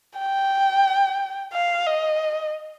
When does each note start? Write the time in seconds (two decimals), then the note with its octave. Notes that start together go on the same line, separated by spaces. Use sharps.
0.18 G5
1.53 F5
1.86 D#5